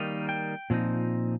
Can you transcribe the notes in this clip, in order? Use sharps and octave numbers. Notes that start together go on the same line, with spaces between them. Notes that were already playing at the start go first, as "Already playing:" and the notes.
Already playing: D#3 G3 A#3 D#4
G5
A#2 F3 C4 D#4